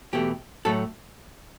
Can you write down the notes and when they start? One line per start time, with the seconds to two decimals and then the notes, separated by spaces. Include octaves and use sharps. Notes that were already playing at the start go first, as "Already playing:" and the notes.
0.13 E2 B2 A3 G4
0.65 A2 F#3 A3 A4